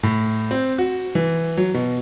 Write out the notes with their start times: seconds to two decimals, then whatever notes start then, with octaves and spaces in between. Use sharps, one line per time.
0.03 A2
0.51 C4
0.78 F#4
1.15 E3
1.57 F#3
1.74 B2